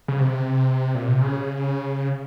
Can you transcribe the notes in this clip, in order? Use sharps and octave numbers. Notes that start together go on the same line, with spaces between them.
C#3
C3
A#2
C3
C#3